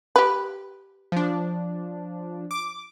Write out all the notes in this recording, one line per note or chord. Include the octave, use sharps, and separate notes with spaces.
G4 B4
F3 D4
D6